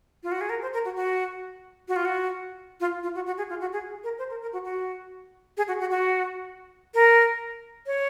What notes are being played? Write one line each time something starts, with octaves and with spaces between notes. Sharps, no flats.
F4
F#4
G#4
A#4
C5
A#4
F#4
F#4
F#4
F4
F#4
F4
F4
F#4
F#4
G#4
F4
F#4
G#4
A#4
C5
A#4
A#4
F#4
F#4
G#4
F#4
F#4
F#4
A#4
C#5